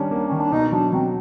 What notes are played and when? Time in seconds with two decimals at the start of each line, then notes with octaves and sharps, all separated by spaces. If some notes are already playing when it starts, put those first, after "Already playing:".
Already playing: D#3 G3 C#4 D4
0.11 A#3
0.28 D#3 C#4
0.39 D4
0.51 B2 D#4
0.72 F#3 D4
0.92 F#3 C4